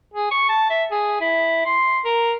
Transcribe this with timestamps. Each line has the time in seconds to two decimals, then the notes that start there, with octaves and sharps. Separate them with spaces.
0.14 G#4
0.31 C#6
0.49 A5
0.70 E5
0.91 G#4
1.21 E4
1.66 C6
2.05 A#4